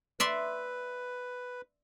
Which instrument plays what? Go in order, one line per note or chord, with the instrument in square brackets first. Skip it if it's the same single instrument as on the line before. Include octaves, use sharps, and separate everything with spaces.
[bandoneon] B4 [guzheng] D5 E5 C6